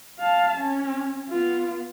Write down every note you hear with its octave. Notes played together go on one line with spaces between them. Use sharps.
F5 A5
C#4
B3 F4